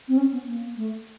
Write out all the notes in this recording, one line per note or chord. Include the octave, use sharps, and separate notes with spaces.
C4
C#4
B3
A#3
A3